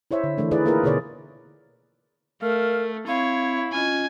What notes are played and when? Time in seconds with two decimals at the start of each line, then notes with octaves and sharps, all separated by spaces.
0.11 E4 C5 C#5 E5
0.24 D3
0.38 D#3 E3 A3 D4
0.51 D#4 E4 G#4 B4 D5
0.65 A#3 E4 F4 G#4 A#4 B4
0.83 B2 D3 G#4 C#5 D5
2.42 A3 A#4 F5
3.07 C4 E4 C#5 F5
3.73 C#4 F4 D#5 G#5